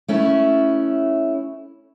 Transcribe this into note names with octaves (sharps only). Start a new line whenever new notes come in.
A3 C#4 E4